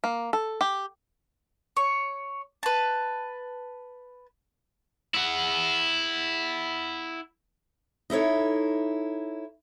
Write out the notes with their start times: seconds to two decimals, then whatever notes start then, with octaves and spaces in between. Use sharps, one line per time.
0.04 A#3
0.33 A4
0.61 G4
1.77 C#5
2.63 B4 A5
5.15 E4 F#5
8.10 D#4 E4 A4 C#5